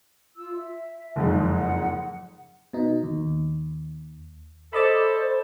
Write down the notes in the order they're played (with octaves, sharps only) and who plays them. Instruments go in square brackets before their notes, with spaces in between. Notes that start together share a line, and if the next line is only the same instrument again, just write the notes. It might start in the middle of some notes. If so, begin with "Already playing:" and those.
[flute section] F4 E6
E5
[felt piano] F#1 F2 G#2
[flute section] F#5
[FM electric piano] B2 D#4
D#2
[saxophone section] A4 [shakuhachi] C5 [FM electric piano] D5 D#5 B5